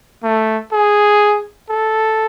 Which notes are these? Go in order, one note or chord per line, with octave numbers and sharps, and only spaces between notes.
A3
G#4
A4